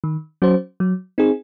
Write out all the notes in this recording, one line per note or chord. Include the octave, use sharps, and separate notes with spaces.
D#3
F#3 C#4 F#4 C5
F#3
C4 D#4 G#4